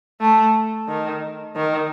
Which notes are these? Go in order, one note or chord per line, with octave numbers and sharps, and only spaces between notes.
A3
D#3
D#3